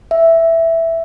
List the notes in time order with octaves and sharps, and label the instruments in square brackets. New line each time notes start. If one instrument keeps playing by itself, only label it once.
[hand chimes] E5